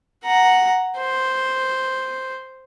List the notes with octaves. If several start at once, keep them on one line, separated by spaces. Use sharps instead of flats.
F#5 A#5
C5